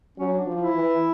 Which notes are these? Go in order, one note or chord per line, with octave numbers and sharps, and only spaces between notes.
F#3 C#4
D4
F3
E4
E3